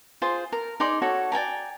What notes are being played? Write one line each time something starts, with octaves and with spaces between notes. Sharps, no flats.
F4 G#4 C5
A#4
D#4 G#4 D5 C6
F#4 A4 C#5
D5 G5 G#5 A#5